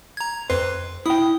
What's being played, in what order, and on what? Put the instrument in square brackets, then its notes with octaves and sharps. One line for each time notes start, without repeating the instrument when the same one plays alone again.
[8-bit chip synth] A#5 G#6
[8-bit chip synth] F2 B4 [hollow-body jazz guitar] C5
[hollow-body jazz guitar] E4 G5 [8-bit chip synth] D#6